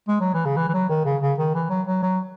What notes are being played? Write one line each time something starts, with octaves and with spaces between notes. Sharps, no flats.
G#3
F#3
E3
C#3
E3
E3
F#3
D#3
C#3
C#3
D#3
E3
F#3
F#3
F#3